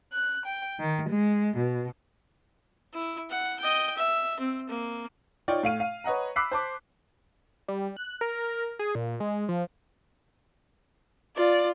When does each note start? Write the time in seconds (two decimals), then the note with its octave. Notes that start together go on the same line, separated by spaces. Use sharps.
0.13 F#6
0.45 G5
0.79 D#3
1.08 G#3
1.56 B2
2.94 E4
3.30 F#5
3.60 D#5 G5
3.97 E5
4.39 C4
4.69 A#3
5.48 D#4 F4 C#5 D5 G5
5.63 A2 F5 D#7
5.80 F5
6.04 B4 C#5 D#5 F#5 A#5
6.36 B5 D6 E6 F#6 B6 C7
6.52 C5 A5 D6
7.68 G3
7.97 F#6
8.21 A#4
8.79 G#4
8.95 A#2
9.20 G#3
9.49 F3
11.36 F4 D5